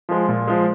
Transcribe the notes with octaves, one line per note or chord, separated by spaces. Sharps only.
F3 G#3
A#2
F3 G#3